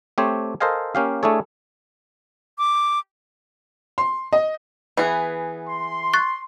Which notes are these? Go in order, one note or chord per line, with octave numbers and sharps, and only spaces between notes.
A3 C4 G4 C5 C#5
A4 A#4 C5 D#5 F5 G#5
A#3 C#4 G4 F5
A3 D4 E4 G#4 A4 C#5
D6
C6
D#5
E3 B3 G#4
C6
C#6 F#6 A6